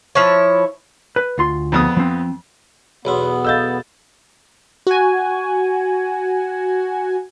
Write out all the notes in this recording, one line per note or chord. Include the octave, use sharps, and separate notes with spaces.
F3 E4 C#5
B4
D2 F4 C6
F2 B3 D#6
F3 C4
B1 E2 B3 E4 C#5 B5 C6
A4 D#5 F5 E6 G6 A6
F#4 G#5